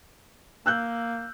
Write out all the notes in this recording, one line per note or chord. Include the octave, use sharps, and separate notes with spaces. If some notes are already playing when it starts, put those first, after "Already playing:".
A#3 E6 F#6 G6